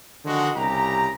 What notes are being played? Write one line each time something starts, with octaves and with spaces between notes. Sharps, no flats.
D3 D#3 F3 G#3 F#4
C2 C#3 G4 A#5